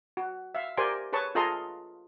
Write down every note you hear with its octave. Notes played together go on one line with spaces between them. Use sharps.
F#4
E5 F5
G4 A#4 C5 D5 G#5 C6
G#4 B4 C#5 A5 C#6
F4 G#4 A4 D#5 A#5 C6